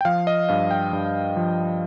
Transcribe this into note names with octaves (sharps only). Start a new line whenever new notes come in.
G5
F3 F5
D#5
G2 F5
G5
G2
F3